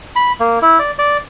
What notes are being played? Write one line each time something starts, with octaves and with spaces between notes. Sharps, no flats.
B5
A#3
E4
D5
D5